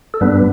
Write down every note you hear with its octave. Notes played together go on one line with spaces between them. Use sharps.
A4
G2 G3 B3 D4 B4